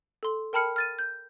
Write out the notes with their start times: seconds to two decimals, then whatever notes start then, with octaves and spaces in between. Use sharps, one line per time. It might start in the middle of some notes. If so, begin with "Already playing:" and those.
0.23 A4 C6
0.53 A#4 G5 A5 B5 F6 C#7
0.76 F6 A6 D#7
0.99 G6